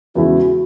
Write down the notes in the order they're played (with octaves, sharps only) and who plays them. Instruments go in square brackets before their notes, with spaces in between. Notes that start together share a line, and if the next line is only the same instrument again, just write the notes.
[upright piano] E2 C#3 G#3 E4 G#4 [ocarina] F#4